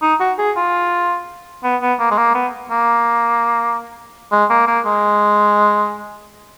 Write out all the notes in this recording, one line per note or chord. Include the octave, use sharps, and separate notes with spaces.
D#4
F#4
G#4
F4
B3
B3
A#3
G#3
A#3
B3
A#3
G#3
A#3
A#3
G#3